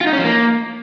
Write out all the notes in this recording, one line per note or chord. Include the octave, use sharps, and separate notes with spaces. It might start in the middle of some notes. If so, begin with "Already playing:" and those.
F4
D#4
C#4
F3
A#3